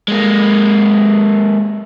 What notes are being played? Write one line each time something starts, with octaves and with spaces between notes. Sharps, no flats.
G#3 A#3